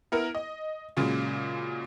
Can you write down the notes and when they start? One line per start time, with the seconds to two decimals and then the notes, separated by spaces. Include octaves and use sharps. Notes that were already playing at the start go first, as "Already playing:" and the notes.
0.12 B3 E4 A#4
0.35 D#5
0.97 A#2 C#3 F#3 G#3